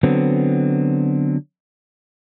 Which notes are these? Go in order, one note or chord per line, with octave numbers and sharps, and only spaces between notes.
D3 F#3 B3 C4